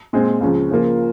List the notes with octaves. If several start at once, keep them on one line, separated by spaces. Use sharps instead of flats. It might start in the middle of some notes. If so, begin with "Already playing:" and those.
A#2 G#3 C4
C#2 C#3 F3
C#3 F3 A#3 F4